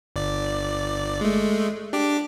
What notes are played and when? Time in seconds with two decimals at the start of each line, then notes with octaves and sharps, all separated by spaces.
0.16 G1 D5
1.21 G#3 A3
1.93 D4 G4 D6